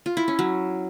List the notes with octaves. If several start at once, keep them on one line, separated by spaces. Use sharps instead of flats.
F4
E4
C#4
F#3